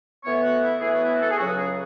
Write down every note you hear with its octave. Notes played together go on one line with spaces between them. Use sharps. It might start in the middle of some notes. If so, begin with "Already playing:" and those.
A2 E3 B3 C#5
F#4
E4
A2 E3 B3 G#4
F#4
E4
F#4
A4
G#4
C#2 C#3 F#3 C#4 F#4
G#4